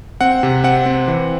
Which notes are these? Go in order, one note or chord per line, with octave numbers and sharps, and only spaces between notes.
C4 F#5
C3
C4 F#5
C4
E3